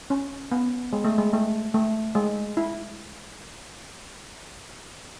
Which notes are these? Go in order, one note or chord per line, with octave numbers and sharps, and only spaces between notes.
C#4
B3
G#3
A3
G#3
A3
A3
G#3
E4